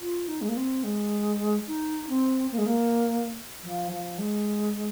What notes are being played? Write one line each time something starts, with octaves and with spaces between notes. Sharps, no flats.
F4
D#4
G#3
A#3
C4
G#3
D#4
C4
A#3
G#3
A#3
F3
F3
G#3